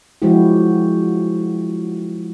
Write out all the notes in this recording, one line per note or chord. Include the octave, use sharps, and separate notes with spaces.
F3 F#3 G#3 E4 F#4 G4